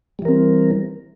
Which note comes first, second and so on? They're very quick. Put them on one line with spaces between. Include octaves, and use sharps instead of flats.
G3 E3 A#4 C4